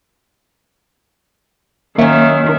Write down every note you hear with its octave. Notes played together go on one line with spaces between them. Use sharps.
D#3 F#3 A#3 C#4 E5